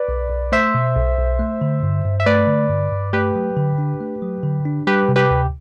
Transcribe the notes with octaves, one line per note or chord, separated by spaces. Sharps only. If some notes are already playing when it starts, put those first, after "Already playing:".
Already playing: B4 D5
B1
B1
A3 C5 E5
B2
B1
B1
A3
D3
G2
G2
E5
A3 B4 D5
D3
G2
G2
A3 G4 B4
F#3
D3
D4
A3
F#3
D3
D4
G3 G4 B4
C3
G4 B4
D2